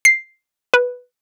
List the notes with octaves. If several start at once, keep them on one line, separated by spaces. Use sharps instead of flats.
C7
B4